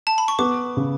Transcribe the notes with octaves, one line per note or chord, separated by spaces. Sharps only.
A5
B5
C#6
B3 D6
C#3